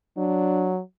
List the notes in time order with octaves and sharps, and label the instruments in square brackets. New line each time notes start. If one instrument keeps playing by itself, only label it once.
[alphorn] F#3 [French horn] D4